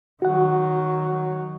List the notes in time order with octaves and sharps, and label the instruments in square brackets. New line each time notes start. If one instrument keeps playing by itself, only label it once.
[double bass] D#3 F#3 [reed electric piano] F#4 F#5